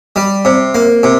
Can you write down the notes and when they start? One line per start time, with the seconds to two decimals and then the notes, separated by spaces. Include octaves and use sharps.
0.16 G3
0.45 C3
0.75 A#3
1.03 C3